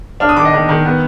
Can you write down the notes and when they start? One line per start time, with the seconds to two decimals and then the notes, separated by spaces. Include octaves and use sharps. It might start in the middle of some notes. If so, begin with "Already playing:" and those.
0.20 D4 F6
0.29 D#6
0.36 D#3 D6
0.45 D#5
0.53 D#3
0.69 D#3
0.85 B3